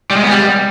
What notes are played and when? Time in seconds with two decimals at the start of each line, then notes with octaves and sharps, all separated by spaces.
0.11 G3
0.17 G#3
0.23 B3
0.29 G3